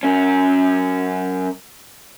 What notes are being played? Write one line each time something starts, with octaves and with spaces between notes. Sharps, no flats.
F#2 C#4